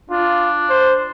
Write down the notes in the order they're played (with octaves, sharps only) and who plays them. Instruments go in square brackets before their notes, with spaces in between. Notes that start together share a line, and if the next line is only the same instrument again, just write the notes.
[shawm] D4 [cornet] F4
[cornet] C5